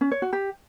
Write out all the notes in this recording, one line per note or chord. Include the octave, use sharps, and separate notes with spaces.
C#4
C#5
F#4
G4